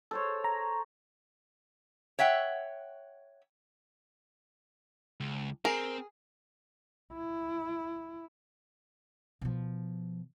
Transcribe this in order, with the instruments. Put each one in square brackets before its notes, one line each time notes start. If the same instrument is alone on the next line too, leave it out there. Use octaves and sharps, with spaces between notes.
[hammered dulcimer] A4 C5 C#5
[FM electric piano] A#5
[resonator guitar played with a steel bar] C#5 E5 F#5 G5
[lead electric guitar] C#2
[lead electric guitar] C4 [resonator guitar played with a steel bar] G#4 [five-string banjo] A#4
[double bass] E4
[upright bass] B2 F3